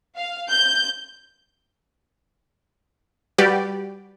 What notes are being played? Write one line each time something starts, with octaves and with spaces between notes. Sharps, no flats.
F5
G6
G3 F#4 G4 B4 D5